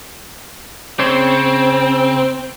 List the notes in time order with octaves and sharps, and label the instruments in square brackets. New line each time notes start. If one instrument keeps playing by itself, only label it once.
[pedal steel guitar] C#3 C#5 C6 [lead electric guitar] C4